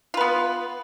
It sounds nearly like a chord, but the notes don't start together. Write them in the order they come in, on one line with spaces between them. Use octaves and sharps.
F4 B4 B3